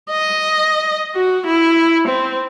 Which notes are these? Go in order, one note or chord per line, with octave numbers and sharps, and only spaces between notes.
D#5
F#4
E4
C4